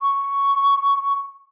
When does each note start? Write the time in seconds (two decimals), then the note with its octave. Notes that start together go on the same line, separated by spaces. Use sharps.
0.01 C#6